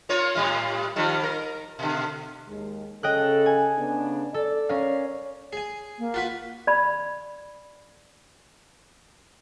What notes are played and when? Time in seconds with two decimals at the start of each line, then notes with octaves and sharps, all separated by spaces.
0.09 A#3 F4 C#5
0.35 A2 G3 F4
0.96 D#3 F3 G3
1.23 A#4
1.79 B2 D3
2.47 D#2 G#3
3.03 C#3 A4 D#5 G5 F#6
3.46 G#5
3.78 C#3 B3 D4
4.34 A4 D5
4.69 C#4 A#4 F5
5.53 G#4 G#5
5.99 A#3
6.14 F4 F#4 B4
6.67 D5 B5